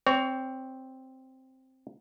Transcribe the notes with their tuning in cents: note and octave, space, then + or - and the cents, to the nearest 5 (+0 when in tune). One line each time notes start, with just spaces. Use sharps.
C4 +0 C#5 +25